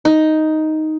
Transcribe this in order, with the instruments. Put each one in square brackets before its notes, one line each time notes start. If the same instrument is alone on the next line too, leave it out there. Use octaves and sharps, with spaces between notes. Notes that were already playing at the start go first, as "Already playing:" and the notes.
[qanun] D#4